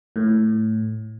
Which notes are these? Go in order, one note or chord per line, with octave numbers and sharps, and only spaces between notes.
A2